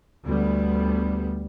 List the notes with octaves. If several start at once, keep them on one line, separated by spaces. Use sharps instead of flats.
D2 G3 B3